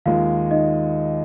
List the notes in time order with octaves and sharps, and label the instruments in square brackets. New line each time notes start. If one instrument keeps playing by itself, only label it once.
[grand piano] D#2 D#3 G#3 [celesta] F4 F5
[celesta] D#4 D#5